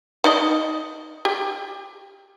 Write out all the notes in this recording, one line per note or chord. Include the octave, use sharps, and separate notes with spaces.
D#4 D5 D#5
G4